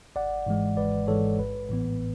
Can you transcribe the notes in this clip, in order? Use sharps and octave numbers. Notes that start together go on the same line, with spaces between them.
G#1 D5 F#5
G#2 E3 G#3
G#1 B4 D5
G#2 E3 G#3 A4 C#5
A1 B4
A2 E3 B3